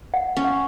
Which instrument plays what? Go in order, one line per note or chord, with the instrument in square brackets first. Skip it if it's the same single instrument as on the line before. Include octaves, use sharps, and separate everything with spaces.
[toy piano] F#5
[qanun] C#4
[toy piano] F#5